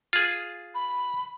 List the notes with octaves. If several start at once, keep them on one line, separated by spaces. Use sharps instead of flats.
F4 G#4
B5